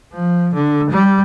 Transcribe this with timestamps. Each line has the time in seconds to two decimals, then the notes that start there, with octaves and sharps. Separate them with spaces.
0.13 F3
0.54 D3
0.90 G3